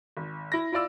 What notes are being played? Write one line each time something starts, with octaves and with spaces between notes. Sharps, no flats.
G#1
E4 A#6
E4 F4 D5 E6